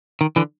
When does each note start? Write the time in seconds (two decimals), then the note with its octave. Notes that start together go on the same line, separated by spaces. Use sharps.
0.21 D#3
0.36 D3 E3